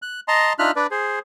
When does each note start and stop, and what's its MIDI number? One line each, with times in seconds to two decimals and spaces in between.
0.02 0.20 90
0.28 0.53 75
0.28 0.53 81
0.28 0.53 82
0.28 0.53 84
0.59 0.71 62
0.59 0.71 63
0.59 0.71 65
0.59 0.71 76
0.59 0.71 89
0.59 0.71 90
0.76 0.87 62
0.76 0.87 71
0.76 0.87 74
0.91 1.19 68
0.91 1.19 72